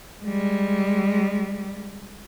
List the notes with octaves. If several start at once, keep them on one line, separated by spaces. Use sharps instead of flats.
G3 G#3